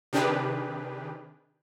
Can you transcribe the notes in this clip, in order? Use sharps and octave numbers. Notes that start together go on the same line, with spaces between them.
C3 D#3 D4 G4 G#4 B4